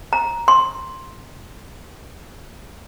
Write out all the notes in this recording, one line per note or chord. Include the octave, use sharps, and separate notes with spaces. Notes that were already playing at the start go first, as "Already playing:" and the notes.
A#5
C6